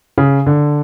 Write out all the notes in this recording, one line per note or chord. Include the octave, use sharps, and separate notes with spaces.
C#3
D3